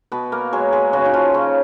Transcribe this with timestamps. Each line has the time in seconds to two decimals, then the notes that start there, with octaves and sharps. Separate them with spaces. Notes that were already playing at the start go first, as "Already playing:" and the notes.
0.12 B2 B3 B4
0.32 A#3 A#4
0.53 F#3 G#3 G#4
0.73 G#3 G#4
0.93 C#3 F#3 F#4
1.05 D#4
1.14 F3 F4
1.34 C#3 C#4